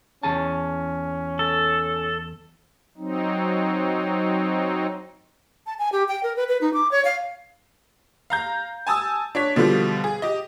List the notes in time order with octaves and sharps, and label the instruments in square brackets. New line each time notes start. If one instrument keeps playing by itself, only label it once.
[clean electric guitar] E2 G#4 A5 [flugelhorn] C#4
[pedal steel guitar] A4
[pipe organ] F#3 C4 D#4
[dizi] A5
G#5
G4
G5
A#4
B4
B4
D#4
D6
C#5
F5
[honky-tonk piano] F5 A#5 G6
G#5 A5 D#6 E6
D4 C#5 B6
B2 D3 F3 G3
G#4
G4 D#5